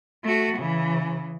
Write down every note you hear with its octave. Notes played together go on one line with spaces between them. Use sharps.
A3 F#4
C#3 E3